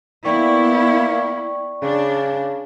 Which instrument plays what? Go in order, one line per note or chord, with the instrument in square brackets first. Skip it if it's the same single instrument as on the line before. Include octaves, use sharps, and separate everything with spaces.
[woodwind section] A#3 [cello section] B3 E4 [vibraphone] D5 G5 C#6
[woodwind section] C#3 [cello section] D4